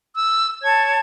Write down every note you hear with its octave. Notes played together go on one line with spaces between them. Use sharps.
E6
C#5 A5 G#6